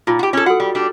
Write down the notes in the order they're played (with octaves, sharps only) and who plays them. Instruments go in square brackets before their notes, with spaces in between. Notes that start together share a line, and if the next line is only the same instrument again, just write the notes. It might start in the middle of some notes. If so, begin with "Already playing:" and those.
[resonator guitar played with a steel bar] A#2 [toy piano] D#4 F4
[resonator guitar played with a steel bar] F#4 G4
C#4 A4
[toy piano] F#4 A4 [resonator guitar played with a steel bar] F#5
[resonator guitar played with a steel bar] G3
G3 D4